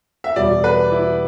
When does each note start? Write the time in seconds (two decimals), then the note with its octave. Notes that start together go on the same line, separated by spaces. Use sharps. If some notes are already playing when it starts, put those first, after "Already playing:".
0.24 E5
0.36 E2 B2 G3 D5
0.64 B4
0.92 E4